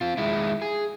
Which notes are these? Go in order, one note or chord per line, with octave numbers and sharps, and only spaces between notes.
C4 F4
D#3 G#3 E4
G#4